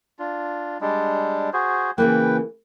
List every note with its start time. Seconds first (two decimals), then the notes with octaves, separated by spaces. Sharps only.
0.19 D4 F4
0.81 G3 G#3 D4
1.53 F#4 G#4 C5
1.98 C#3 E3 A#3 B4 G5